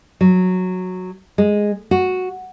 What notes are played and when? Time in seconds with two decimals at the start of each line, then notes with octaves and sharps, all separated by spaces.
0.21 F#3
1.38 G#3
1.91 F#4